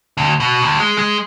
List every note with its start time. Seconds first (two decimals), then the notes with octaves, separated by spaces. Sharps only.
0.17 D2
0.40 B2
0.62 D2
0.80 G#3
0.98 G#3